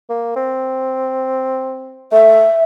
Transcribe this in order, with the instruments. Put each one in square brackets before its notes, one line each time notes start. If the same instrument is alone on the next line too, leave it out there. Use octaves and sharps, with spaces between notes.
[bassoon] A#3
C4
[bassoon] A3 [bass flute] E5